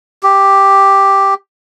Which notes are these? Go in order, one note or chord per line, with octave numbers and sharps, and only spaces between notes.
G4